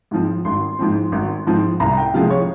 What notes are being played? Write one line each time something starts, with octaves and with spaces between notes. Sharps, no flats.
G#2 F3 C4
G#1 C6
G#2 F3 C4
G#1
G#2 F3 C4
C2 A#5
G5
C3 F3 G#3 F5
C#5